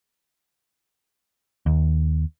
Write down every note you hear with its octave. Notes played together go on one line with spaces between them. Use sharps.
D#2